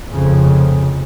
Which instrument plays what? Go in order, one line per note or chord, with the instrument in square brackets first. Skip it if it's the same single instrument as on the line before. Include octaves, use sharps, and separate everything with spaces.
[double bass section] F1 F2 C#3